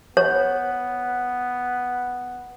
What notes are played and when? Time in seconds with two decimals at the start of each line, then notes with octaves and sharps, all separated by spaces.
0.17 B3 C#5